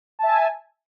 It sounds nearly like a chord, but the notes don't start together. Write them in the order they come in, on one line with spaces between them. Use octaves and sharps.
A5 E5 G#5